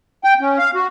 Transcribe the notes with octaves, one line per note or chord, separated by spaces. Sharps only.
G5
C#4
F5
F#4